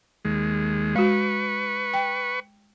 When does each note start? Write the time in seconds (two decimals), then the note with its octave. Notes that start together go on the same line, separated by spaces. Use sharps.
0.25 D#2 G#3
0.96 G#3 F#4 B4 C#6
1.94 G5